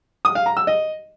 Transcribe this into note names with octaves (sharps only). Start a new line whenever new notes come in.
D#6
F5
A#5
E6
D#5